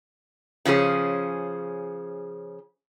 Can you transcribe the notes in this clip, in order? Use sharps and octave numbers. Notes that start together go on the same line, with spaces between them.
C#3 F3 C#4 G#4